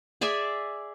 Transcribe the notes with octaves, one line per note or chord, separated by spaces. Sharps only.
G#4 D5 E5 G#5